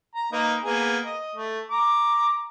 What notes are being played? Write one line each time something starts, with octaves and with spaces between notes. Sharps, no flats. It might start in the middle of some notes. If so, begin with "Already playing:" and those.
A#5
A#3 D#4 B4
A#3 B3 G#4
D#5
A3
A#5 D6